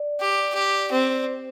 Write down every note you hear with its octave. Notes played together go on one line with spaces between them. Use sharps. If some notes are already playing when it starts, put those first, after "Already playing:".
Already playing: D5
G4
G4
C4
C5